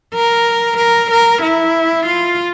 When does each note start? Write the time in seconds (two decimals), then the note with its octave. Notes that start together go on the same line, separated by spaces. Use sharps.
0.14 A#4
0.77 A#4
1.11 A#4
1.42 E4
2.06 F4